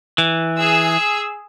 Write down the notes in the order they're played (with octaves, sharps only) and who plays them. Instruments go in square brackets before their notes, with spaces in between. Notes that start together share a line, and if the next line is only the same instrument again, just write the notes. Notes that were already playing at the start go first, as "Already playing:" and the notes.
[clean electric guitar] E3
[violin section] G#4 E6